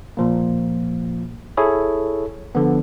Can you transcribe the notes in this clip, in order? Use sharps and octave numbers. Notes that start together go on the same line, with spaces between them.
A#2 F3 A#3
E4 G#4 A4 C#5
D3 F3 B3